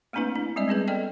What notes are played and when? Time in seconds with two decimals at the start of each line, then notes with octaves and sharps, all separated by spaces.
0.13 A3 A#3 C4 D4 E4 B4
0.36 D4
0.56 G3 G#3 C4 D5 D#5
0.68 B3 C#4 G#4 B4
0.88 A4 D5 D#5 G5